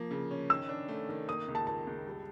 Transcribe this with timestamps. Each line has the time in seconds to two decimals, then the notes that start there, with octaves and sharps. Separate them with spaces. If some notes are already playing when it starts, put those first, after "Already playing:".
Already playing: F3 A#3
0.11 C#3
0.31 C#4
0.50 D#3 E6
0.69 D4
0.88 A3
1.09 D#3
1.28 A#3 D#6
1.48 C#2
1.55 A5
1.67 A#3 A5
1.87 C#2
2.07 G3